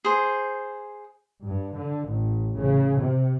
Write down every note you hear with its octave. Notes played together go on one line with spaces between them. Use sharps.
G#4 C5
G2
D3
A1
C#3
C3